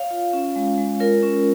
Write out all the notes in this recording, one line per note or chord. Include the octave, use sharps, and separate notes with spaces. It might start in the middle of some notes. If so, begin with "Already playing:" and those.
Already playing: C#5 F5
F4
C#4
G#3
G#3
F4 A#4 C#5
C#4